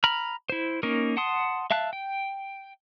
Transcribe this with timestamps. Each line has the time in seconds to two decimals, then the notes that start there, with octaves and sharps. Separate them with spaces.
0.04 A#5 B5 F6
0.50 E4 C5
0.83 A#3 C#4 D#4 A#4
1.17 F#5 A5 C6 D#6
1.71 E5 F5 A5 F#6
1.93 G5